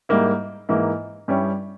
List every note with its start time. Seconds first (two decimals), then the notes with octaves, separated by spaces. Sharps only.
0.09 G#2 G3 A#3 E4
0.69 G#2 E3 A#3 E4
1.28 G2 G3 C#4 E4